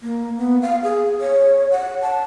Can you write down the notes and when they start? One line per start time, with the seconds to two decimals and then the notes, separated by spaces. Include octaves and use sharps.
0.01 A#3
0.37 B3
0.62 F5
0.83 G#4
1.21 C#5
1.71 F#5
2.02 A5